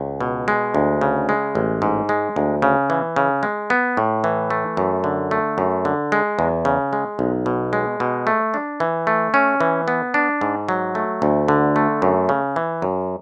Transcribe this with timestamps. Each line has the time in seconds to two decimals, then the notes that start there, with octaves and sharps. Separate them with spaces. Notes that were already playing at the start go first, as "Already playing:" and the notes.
Already playing: C#2
0.21 B2
0.48 G#3
0.74 D2
1.01 C#3
1.29 G#3
1.55 A1
1.82 G#2
2.09 G#3
2.36 D2
2.62 C#3
2.90 E3
3.16 C#3
3.43 G#3
3.70 B3
3.97 A2
4.24 E3
4.50 A3
4.77 F#2
5.04 D3
5.31 A3
5.58 F#2
5.85 D3
6.12 G#3
6.39 E2
6.65 C#3
6.93 G#3
7.19 B1
7.46 B2
7.73 G#3
8.00 B2
8.27 A3
8.54 D4
8.80 E3
9.07 A3
9.34 C#4
9.61 E3
9.88 B3
10.14 D4
10.41 G#2
10.69 F#3
10.95 A3
11.22 D2
11.48 D3
11.76 A3
12.02 F#2
12.29 C#3
12.56 E3
12.82 F#2